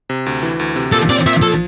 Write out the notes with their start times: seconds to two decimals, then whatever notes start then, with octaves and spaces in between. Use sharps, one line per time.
0.10 C3
0.26 D2
0.43 E3
0.59 D2
0.76 C3
0.92 A#2 A4
1.09 C4 D5
1.26 A#2 E5
1.42 F3 A4